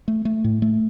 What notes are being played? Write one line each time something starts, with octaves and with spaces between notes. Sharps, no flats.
A3
A3
A2
A3